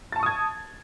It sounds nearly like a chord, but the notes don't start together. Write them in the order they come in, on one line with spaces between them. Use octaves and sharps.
A6 A5 C#6 D#6 G#6